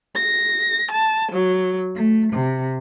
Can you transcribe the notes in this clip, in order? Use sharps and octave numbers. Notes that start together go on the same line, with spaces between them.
A#6
A5
F#3
A3
C3